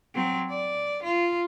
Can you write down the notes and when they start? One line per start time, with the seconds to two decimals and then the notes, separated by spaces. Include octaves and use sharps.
0.15 F#3 C4
0.50 D5
1.03 F4